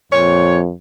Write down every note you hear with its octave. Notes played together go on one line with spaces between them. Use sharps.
F2 A#2 C#5